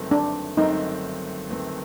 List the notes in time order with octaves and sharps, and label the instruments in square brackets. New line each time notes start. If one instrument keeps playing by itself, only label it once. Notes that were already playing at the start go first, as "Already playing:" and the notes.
Already playing: [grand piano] G1 F#2 D#3 A3 C4
[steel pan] D4
[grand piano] G1 F#2 D#3 A3 C4 [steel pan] D#4
[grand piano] G1 F#2 D#3 A3 C4